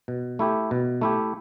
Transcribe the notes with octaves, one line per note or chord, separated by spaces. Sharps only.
B2
A3 E4 G4
B2
A3 E4 G4